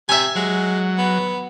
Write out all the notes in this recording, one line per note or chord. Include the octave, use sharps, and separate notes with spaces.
C3 E5 G#5
F#3 G#3
B3